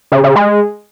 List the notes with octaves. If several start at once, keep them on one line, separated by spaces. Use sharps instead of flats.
C#3
C#3
G#3